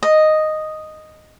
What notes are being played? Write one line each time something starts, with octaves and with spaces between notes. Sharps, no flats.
D#5